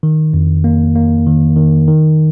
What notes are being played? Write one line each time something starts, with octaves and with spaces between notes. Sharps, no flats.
D#3
F2
A#3
A#3
D#3
D#3
D#3